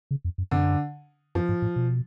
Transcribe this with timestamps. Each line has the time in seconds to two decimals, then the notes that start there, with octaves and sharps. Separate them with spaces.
0.11 C#3
0.24 F2
0.38 F#2
0.51 F#2 D3
1.35 F#2 F3
1.49 G#2
1.62 A2
1.76 B2